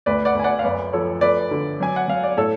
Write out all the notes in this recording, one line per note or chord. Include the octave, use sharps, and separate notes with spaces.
D2 B4 D5
D5 F#5
D2 G#5
D5 F#5
F5
F#2 B4 D5
F3 A4 C#5
A3 B4 D5
D3
F#3 G#5
F#5
F#3 F5
D5
A2 A4 C#5